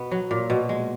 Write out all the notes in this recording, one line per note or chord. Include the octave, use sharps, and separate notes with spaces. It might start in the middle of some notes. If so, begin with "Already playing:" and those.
Already playing: B2 B3
F#3
A#2
B2
G#3